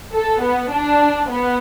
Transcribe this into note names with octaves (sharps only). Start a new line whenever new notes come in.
A4
B3
D4
B3